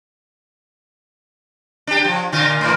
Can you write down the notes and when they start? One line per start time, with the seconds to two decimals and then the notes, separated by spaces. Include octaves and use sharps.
1.87 D4 G4
2.04 F3
2.32 A#2 D3 F4
2.61 A2 E3